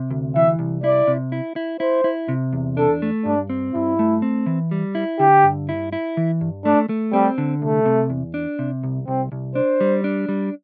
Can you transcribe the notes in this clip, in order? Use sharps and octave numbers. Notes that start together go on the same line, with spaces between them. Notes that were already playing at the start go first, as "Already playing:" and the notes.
Already playing: C3
D2
E3 E5
C2
E4 D5
C3
E4
E4
E4 C5
E4
C3
E2
D4 A4
A3
G2 D4
C4
G2 E4
A3
C4
E3
G3
E4
D3 G4
G2
E4
E4
E3
G2
A3 D4
A3
G3 C4
D3
C2 A3
C3
E2
D4
C3
C2
C2 C4
C2
D4 C5
G3
D4
G3